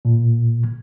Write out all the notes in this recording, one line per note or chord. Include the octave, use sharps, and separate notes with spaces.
A#2